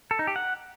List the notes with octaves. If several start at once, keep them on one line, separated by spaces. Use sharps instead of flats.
A4
D#4
G4
F#5